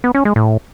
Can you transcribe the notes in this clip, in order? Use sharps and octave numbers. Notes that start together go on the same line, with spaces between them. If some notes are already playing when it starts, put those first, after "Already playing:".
B3
C#4
G#3
A2